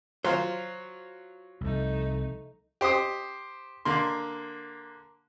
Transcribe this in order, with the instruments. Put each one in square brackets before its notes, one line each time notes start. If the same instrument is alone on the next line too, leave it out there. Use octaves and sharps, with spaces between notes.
[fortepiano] F#3 F4 [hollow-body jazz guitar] C5
[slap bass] C2 [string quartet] F3 A3 D#4
[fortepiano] G4 C5 C6 D#6
D3 A#3 C6